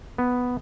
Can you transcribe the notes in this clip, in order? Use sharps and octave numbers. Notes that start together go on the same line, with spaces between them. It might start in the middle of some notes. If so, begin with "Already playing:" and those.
B3